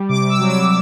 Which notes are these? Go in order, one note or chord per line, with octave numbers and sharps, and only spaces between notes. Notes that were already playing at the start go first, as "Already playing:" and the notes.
Already playing: G3
C3 D6
E6
F#3
E6